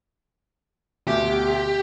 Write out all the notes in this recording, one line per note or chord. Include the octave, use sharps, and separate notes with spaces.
D2 B2 G4